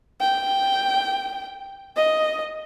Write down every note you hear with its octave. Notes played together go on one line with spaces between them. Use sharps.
G5
D#5